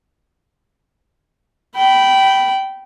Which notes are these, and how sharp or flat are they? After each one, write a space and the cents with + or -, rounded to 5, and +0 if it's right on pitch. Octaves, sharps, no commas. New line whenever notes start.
G5 -15 B5 +0